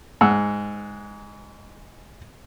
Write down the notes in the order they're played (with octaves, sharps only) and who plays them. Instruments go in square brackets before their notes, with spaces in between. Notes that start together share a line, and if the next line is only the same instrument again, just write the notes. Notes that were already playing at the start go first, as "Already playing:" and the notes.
[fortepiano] G#2 F#5 E6